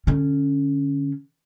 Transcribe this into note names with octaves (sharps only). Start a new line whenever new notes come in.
D3 C#4